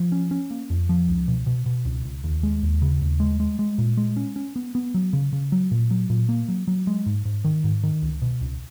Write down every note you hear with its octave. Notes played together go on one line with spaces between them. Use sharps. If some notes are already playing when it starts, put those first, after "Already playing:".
Already playing: F3
C#4
C#4
A#3
F2
F3
C#2
B2
B2
B2
C#2
C#2
D#2
G#3
D#2
C#3
D#2
G#3
G#3
G#3
A#2
G#3
C#4
C#4
B3
B3
F#3
C#3
C#3
F#3
A#2
F#3
A#2
A#3
F#3
F#3
G#3
G#2
G#2
D#3
G#2
D#3
C#2
B2
C#2